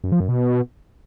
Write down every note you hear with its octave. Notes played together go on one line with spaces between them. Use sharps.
F#2
F3
F#2
B2